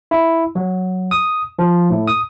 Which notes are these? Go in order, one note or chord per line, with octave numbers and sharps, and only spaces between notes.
E4
F#3
D#6
F3
A2
D#6